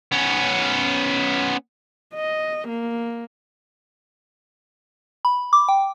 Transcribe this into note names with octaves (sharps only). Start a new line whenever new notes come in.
B3 C#4
D#5
A#3
B5
D6
G5